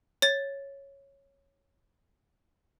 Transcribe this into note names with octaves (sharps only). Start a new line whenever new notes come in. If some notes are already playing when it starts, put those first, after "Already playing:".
C#5 A6